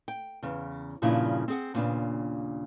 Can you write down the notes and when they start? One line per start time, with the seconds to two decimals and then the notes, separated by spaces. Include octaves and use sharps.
0.08 G5
0.43 E2 C#3
1.02 G2 A#2 C#3 F3 D4 E4
1.48 C4 G#4 F#5
1.74 D#2 A#2 C#3 B3 D4